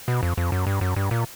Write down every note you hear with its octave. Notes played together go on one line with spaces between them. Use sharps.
B2
F2
F2
F#2
G2
F#2
G2
A#2